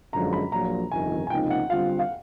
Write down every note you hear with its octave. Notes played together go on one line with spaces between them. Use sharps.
F#2 D3 F3 G#3 A#5
B5
A#1 A#2 F#3 A#5
G1 F2 C3 D#3 G#5
G#5
C#2 C3 F3 A#3 D#4 G5
F#5
D3 G3 C4 F4 F5
F5